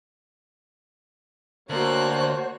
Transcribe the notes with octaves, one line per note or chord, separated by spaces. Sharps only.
D2 A#3 F#4 C5 C#5 F#6